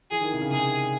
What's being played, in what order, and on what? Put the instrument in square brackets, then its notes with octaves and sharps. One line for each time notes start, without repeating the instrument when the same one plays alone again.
[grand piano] E3 [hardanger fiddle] G#4
[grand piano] D#3
C3
C#3
[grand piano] C3 [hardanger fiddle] G#4